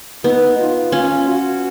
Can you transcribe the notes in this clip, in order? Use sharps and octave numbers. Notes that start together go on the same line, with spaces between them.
B3 D#4
F4
C#4 F4
F#4